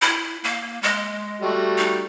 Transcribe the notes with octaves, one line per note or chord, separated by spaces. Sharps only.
E4
A#3
G#3
G3 A3 F#4
D#4